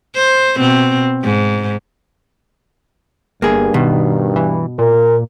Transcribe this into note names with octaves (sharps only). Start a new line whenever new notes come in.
C5
B2 C4
G#2
G1 G2 A#3 G#4
B2 D#3
E3
A#2 A#4